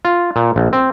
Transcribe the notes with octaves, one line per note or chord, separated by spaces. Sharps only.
F4
A#2
A#1
C4